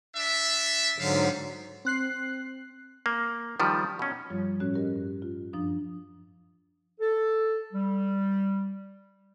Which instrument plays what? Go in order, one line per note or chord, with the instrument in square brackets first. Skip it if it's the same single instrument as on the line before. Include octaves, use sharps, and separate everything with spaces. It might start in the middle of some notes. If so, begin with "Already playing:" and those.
[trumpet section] D4 E5
[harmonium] G#2 D3 F#3 [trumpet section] G3 B3 F5
[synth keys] C4 F#6 C7
[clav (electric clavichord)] A#3
D#3 F3 G3
B2 C#4
[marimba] G2 F3 G3 F4 C#5
A2 C#4 F#4 C#5 F#6
G4 A#4 D#5
G2
F4
F#2 F3 D4 D#6
[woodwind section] A4
G3